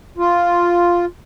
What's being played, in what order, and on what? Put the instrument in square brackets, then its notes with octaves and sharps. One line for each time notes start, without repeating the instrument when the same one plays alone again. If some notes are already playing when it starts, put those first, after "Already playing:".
[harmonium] F4